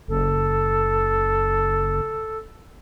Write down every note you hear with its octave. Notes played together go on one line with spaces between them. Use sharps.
F#1 A4